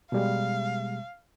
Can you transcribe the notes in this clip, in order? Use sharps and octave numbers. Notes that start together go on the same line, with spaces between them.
B2 G3 G#3 F5